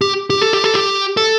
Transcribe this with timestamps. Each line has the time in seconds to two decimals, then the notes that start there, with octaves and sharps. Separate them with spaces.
0.01 G4
0.30 G4
0.41 A4
0.53 G4
0.64 A4
0.75 G4
1.17 A4